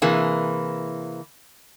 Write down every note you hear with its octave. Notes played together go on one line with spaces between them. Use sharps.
C3 E3 A#3 G#4